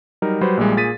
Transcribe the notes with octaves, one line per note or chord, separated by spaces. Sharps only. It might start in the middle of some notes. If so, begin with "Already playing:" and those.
F#3 G3 D#4 A#4
F#3 G3 B4 C5
A#1 A#2 G3 G#3
A#2 G#4 A6 B6 D#7